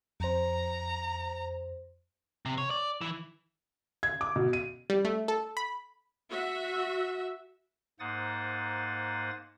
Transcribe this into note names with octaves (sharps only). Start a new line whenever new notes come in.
F2 C5 A#5
C3
C#5
D5
E3
G#6
D6
B2
D#7
G3
A3
A4
B5
F#4 E5
G#2 A#3 C5 F#5 D#6 A6